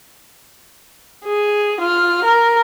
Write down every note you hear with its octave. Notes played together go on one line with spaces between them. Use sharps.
G#4
F4 F6
A#4